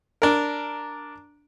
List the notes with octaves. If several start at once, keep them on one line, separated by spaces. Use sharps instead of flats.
D4 A#4